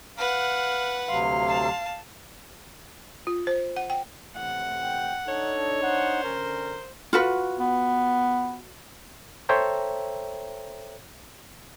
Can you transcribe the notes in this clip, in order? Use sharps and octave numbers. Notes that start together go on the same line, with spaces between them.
B4 F5 F#5
D2 C3 F#3 F5 C6
A5
F4
C5
F#5
G5
A2 C3 E3 F#5
G5
D4 D#4 A4 C#5
C5 F#5
D3 C#4 A#4
F4 F#4 B4
B3
A4 C5 C#5 E5 G5 A#5